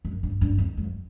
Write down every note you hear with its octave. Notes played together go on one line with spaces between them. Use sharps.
F#2
G2
G2
E2
F#2